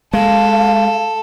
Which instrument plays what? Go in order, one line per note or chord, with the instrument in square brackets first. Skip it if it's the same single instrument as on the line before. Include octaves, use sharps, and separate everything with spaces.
[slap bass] G#3 [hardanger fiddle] A4 [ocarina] F5